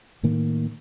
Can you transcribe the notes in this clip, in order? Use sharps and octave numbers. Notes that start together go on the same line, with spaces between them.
A2 D#3 A#3